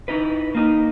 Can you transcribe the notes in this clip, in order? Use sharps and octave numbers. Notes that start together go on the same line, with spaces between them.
D#4 E4 B4
A#3 D#4